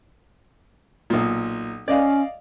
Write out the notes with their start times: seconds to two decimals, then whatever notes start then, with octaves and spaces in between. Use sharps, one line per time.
1.10 B1 A#2
1.88 C#4 D5 D#5 F5